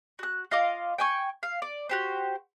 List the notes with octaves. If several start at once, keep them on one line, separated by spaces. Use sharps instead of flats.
F#4 F#6
F4 D#5 F5 D6
G5 G#5 C#6
F5
D5
F#4 G4 C5